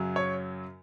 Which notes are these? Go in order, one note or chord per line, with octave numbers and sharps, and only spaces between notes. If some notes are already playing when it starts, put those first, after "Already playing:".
Already playing: F#2 C#3 F#3
C#5